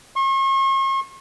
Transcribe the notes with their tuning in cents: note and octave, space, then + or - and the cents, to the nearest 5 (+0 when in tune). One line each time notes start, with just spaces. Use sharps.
C#6 -45